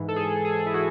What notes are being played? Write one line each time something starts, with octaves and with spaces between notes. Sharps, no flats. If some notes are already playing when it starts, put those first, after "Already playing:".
Already playing: G#2 E3
A4
G#4
G#4
E4
E3 F#4